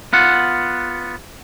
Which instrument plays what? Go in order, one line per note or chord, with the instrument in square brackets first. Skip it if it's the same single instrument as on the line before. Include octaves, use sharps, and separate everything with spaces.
[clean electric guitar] B3 F4 F#5